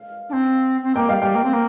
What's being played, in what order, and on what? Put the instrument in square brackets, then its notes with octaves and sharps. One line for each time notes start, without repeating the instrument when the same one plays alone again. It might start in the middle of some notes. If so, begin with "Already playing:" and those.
Already playing: [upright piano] F5
[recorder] D4
C4
C4
[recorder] A#3 [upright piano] G5
[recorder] G3 [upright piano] F5
[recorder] G3 [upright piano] G5
[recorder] A#3
C4
A#3